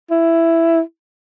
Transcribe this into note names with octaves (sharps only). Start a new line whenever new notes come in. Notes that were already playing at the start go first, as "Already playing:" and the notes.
E4